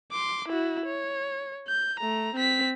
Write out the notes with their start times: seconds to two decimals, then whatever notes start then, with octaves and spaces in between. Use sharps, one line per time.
0.12 C6 D6
0.48 E4 F#4
0.86 C#5
1.68 G6
1.99 A3 A#5
2.35 C4 B6